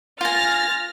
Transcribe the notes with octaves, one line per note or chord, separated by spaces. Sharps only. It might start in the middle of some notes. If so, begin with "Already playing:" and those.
F4 G#5 F6 A6 A#6